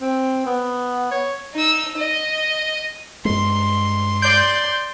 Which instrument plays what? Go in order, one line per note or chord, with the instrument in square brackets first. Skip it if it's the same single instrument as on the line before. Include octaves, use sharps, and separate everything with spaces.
[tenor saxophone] C4
B3
C#5
[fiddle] D#4 E6
D#5
[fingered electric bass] G2 G#3 [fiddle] C6
[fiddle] D5 C6 [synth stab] G6